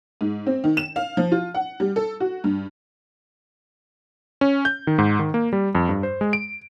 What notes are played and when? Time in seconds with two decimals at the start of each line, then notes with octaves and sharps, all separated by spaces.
0.21 G#2
0.46 C4
0.64 D#3
0.77 E7
0.96 F5
1.17 F3
1.32 F4
1.54 F#5
1.80 G3
1.96 A4
2.20 F#4
2.44 G2
4.41 C#4
4.65 G6
4.87 D#3
4.98 G#2
5.19 D#3
5.34 A#3
5.53 G3
5.75 F2
5.89 G2
6.03 C5
6.21 G#3
6.33 D7